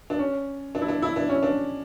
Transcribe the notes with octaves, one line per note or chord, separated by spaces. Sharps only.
D4
C#4
D4
E4
D4
E4
D4
C#4
D4